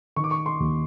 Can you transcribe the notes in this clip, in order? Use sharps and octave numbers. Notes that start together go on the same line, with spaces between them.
D#3 C#6
D6
C#6
C6
D#2